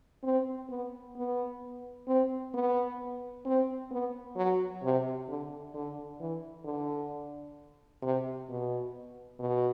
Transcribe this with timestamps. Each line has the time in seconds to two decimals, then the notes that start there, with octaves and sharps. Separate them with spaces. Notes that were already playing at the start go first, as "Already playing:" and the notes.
0.24 C4
0.70 B3
1.16 B3
2.08 C4
2.54 B3
3.45 C4
3.91 B3
4.36 F#3
4.83 C3
5.28 D3
5.74 D3
6.20 E3
6.65 D3
8.02 C3
8.49 B2
9.40 B2